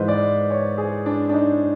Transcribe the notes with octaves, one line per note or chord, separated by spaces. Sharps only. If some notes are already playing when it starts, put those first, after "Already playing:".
Already playing: G#2 E3 G#3 B4 C5
D5
C#5
G#4
D4
D4
D#4